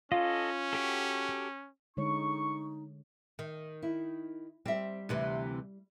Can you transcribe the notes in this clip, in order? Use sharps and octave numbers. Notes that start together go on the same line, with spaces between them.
C#4 F4 A4 D#5
F#4 G4 A4
D3 G#3 D#4 C#5 C#6
D#3
E4
G3 C4 E5
D2 C3 E3